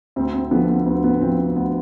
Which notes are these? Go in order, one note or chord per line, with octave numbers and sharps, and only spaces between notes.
D2 C4
C4
D3 F3 B3
B3
D2 B3
B3
D3 F3 C4
C4
D2 B3